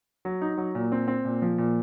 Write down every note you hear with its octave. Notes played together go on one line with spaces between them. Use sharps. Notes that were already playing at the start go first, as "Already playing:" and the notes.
F#3
D#4
F#3
A#2
C4
C4
A#2
F3
A#2